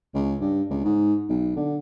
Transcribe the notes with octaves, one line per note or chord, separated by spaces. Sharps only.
C#2
G2
C#2
G#2
B1
D3